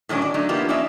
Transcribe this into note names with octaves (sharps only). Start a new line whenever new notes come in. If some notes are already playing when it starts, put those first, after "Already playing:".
A2 D#3 F#3 C#4 D4
D5
F#3 A3 D4 D#4
F3 A#3 B3 E4 F4 G4
F3 A#3 C#4 D#4 D5 E5